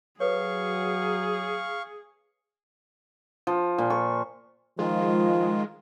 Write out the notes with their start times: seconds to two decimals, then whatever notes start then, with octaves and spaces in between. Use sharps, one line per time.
0.20 F#3 G#4 A4 B4 C#5 F5 C#6
3.47 F3
3.78 A#2
3.90 C#6
4.79 D#3 F3 G#3 F4